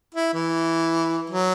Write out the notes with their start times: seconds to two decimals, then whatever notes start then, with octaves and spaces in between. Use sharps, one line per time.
0.15 E4
0.34 E3
1.30 F#3